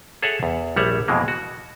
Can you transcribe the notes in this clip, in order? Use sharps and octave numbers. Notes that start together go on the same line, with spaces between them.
G#4 A4 C#5 E5 F#5
E2
A#1 G3 A3 C#5 E5 F#5
F2 B2 E3 G#3 A#3
F#4